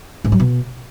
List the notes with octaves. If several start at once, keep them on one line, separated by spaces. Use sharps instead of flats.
G#2
F#3
B2